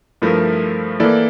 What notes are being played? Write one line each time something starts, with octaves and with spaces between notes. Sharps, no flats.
G2 F3 A3 E4 A#4
E3 A#3 E4 A4 D5